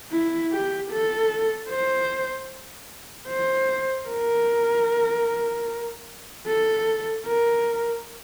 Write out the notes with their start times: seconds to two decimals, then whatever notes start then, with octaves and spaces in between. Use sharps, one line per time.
0.12 E4
0.52 G4
0.91 A4
1.70 C5
3.29 C5
4.09 A#4
6.47 A4
7.26 A#4